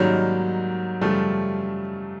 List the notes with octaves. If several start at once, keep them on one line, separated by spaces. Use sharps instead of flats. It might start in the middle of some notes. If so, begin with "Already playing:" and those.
Already playing: G#2 D#3 F#3 G3 A#3 C#4
F#2 C#3 F3 G3 A3